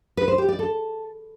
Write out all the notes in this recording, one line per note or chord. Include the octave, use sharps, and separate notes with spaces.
B4
C5
G4
D5
A4